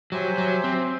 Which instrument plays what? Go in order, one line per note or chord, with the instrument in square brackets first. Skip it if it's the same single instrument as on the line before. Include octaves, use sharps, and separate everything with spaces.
[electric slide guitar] F#3 [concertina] G4 C5 E5 G#5
[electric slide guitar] F#3
C4